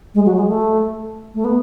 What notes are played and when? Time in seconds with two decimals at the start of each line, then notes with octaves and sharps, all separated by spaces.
0.14 G#3
0.26 F#3
0.36 G#3
0.48 A3
1.34 A3
1.44 B3